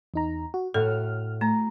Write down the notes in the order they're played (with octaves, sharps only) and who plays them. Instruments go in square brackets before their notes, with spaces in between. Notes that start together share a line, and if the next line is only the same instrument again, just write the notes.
[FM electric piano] E2 D#4 A#5
F#4
[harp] A2 F#4 [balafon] A4 [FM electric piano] F6
[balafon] A3 [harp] A#5